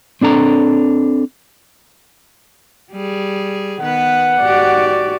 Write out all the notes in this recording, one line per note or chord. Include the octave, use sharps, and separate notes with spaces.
C4 D4 A4 A#5
G3 G#4
D#3 B3 B4 F#5
G#2 F#4 G4 D5